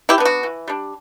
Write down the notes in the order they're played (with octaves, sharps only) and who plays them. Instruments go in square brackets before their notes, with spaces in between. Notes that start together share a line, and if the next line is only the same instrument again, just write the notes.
[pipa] E4 G4
B3 D4
F#4
E3
G3 D4